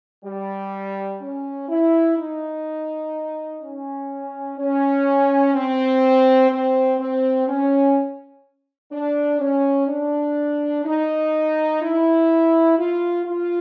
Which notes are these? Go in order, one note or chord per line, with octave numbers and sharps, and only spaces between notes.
G3
C#4
E4
D#4
C#4
C#4
C4
C4
C4
C#4
D4
C#4
D4
D#4
E4
F4
F4